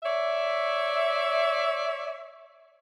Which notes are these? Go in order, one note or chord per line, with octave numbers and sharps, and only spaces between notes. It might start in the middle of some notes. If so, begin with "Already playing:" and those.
C#5 D5 E5